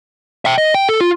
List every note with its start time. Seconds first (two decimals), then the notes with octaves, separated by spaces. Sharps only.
0.45 E5 G5
0.58 D#5
0.74 G5
0.89 A4
1.01 F4